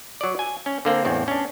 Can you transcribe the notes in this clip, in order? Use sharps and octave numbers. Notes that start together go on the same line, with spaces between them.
F#3 D5
G#5
C#4
D3 A#3 C4
A1 E2 C4
C#4 D4